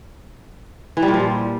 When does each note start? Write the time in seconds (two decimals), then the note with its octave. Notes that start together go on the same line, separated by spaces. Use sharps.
0.97 E3
1.02 G3
1.08 A#2
1.14 F3
1.19 G3